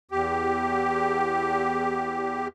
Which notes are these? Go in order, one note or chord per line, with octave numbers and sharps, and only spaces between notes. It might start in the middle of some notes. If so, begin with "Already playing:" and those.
E2 G4